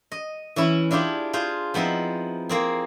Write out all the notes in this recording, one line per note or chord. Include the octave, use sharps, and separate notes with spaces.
D#5
E3 C#4 E4
D4 E4 F4 G4 G#4
F4 G#4 C5
F3 B3 C4 D#4 E4
A#3 C4 G#4